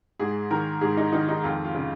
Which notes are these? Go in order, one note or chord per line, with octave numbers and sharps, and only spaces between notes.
G#2 G#4
D#3 A#4
G#2 G#4
D#4
D#3 D#4
D#4
F2 F4
F4
C#3